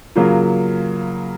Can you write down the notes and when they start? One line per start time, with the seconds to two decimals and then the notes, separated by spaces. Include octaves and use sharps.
0.16 C#3 F#3 A#3 F4